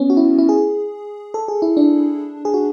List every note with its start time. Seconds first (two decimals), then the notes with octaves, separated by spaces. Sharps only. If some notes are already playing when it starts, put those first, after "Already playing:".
Already playing: B3 C#4
0.10 F#4
0.17 E4
0.38 E4
0.49 G#4
1.34 A4
1.48 G#4
1.62 E4
1.77 D4
2.45 G#4
2.54 F#4